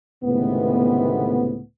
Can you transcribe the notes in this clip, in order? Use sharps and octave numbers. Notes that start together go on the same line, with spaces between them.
C#2 A2 C3 D#3 A3 B3